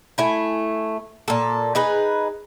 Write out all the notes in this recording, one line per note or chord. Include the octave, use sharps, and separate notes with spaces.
A3 E4 G#5
A#2 A4
D#4 G#4 B4